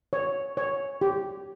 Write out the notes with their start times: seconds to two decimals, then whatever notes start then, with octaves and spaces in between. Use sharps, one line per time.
0.13 C#5
0.57 C#5
1.01 G4